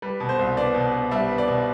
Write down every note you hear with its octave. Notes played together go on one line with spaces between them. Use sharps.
G3 B4
B2
C5
C2
B3 D5
B2
B3
G3 E5
B3
D5
B2